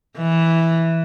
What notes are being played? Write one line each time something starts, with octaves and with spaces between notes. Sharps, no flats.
E3